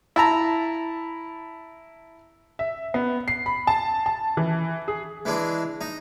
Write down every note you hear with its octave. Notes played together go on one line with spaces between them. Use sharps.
E4 A5 A#5
E5
B3
C7
B5
A5
A5
E3
G#4
E3 G#3 D4
D#4